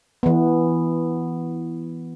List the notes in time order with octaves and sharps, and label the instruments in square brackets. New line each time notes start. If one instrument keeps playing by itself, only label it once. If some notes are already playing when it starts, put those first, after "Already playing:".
[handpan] E3 B3